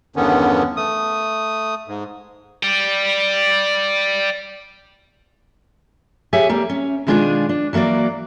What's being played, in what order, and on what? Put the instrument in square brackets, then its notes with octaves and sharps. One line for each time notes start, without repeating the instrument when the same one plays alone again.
[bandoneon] E2 G2 D3 D#3 B3 C#4
A3 D#6
G#2
[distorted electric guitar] D5 G5
[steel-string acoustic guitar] G4 G#4 C#5 E5 G#5
G3 A#3
C#4
B2 D#3 G#3 D4 F4 G#4
D4
E3 F#3 A#3 F#4 D5